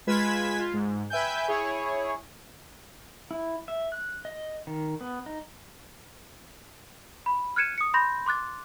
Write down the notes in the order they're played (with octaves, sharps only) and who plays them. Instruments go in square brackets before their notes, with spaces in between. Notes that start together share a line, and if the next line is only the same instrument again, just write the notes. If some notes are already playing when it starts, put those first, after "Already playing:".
[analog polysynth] G#3 F4 B4 G#6 B6 E7
F4
G#2
B4 E5 G5 G#5 G6
E4 G#4 C#5
[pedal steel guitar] E4
E5
F#6
D#5
D#3
B3
D#4
[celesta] B5
F6 F#6 G#6 C#7 D#7 E7
D#6 C#7
B5 C6 G6 A#6
C6 D6 F#6 A6